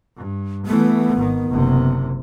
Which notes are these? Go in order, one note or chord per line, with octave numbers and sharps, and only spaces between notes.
G2
E3 A3 B3
G#1 D#3
F#1 C3